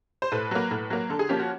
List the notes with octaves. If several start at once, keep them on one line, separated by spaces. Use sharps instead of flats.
C5
A2 B4
F#3 A#3
A2
F#3 A#3
D3 A4
G#4
F3 A#3 C#4 G4
F#4